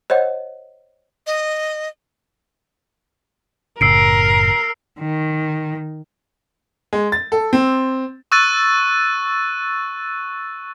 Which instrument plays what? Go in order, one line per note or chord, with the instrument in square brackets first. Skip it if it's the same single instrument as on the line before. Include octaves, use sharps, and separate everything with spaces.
[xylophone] C5 C#5 D#5 F#5
[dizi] D#5
[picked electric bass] F#1 A2 C#3 [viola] A#4 [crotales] E6 C7 D7
[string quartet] D#3
[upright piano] G#3
A6
A4
C4
[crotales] C#6 E6 F#6 A6 D#7